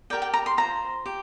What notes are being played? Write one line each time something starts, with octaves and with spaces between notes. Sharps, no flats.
G4 A#4 D5 G5
G5
A#5
C6
F4 C5 A#5
G4